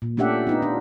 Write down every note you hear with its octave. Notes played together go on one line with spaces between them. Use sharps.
A#2
A3 C#4 D4 G4 E5 F#5
B3 D#4 F4
D4